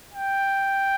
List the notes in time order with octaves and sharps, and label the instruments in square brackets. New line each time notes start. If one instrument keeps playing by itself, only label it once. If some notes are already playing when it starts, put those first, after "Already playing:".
[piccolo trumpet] G5